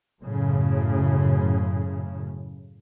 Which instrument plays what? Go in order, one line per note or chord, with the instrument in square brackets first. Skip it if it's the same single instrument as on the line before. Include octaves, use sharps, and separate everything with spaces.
[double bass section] F#2 A2 C#3